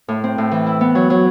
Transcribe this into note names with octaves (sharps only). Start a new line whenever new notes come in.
A2
C4
A2
E3
E4
B3
F#3
F#3